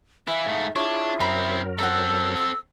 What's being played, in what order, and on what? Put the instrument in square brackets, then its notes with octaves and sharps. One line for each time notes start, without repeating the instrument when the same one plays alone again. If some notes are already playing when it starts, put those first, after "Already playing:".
[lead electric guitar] E3 E4 [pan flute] E5 [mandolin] F5
[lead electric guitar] G#2 A3
[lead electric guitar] D4 [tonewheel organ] E4 F4 G#4 [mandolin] C#5 [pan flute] E5
[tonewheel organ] F#2 F#3 A#4 [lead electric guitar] C4 E4 [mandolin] A#5 B5
[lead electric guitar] C4 A4 [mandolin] F#5 A#5 [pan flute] E6
[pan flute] E6